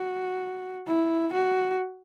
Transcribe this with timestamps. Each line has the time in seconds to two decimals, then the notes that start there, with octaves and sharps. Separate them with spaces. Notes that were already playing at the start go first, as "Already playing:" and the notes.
Already playing: F#4
0.87 E4
1.33 F#4